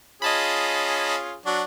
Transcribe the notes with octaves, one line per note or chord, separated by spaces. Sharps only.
C#4 F4 G#4 D#5 A5 B5
F#3 D4 F#4